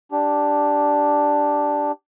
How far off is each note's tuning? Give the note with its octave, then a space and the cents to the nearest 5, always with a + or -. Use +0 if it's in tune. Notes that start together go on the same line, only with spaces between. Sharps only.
D4 +0 G4 +0